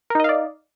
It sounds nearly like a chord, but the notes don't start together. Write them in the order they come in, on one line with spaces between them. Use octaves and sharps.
A#4 D#4 D#5 F5 D5